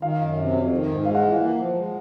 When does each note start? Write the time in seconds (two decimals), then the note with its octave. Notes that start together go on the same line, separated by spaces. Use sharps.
0.01 D#3 F5
0.20 F#2
0.37 C3
0.53 F2
0.72 D#3
0.88 G#2
1.05 G#3 F5
1.15 F#5
1.23 E3 F5
1.40 A#3
1.57 F3
1.74 G#3